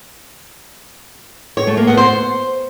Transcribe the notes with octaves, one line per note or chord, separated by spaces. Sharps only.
C#5
A3
A#3
B3
C5